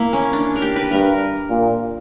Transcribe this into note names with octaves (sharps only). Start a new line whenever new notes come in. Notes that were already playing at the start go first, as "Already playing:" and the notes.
Already playing: A#3 E4
C#4
D4
A#4
G4
B4
G2 A#4
A#2